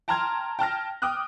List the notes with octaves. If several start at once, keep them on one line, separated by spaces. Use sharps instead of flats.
G5 A5 A#5 C6 F6 G#6
G5 A5 F6 A#6
G5 D6 D#6 F6 F#6